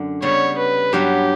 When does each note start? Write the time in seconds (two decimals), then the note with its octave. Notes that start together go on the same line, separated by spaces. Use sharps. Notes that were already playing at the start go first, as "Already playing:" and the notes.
Already playing: F#2 D3
0.22 C#3 G3 B3 C#5
0.58 B4
0.92 G2 F#3 B3 G4